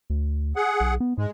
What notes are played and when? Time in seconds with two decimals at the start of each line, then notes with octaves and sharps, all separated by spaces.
0.10 D2
0.56 G#4 F#5
0.80 B1
1.00 B3
1.18 G#2 G#3